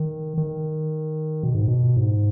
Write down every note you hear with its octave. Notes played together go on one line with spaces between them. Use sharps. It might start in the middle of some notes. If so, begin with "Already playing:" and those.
Already playing: D#3
D#3
B2
G#2
B2
G#2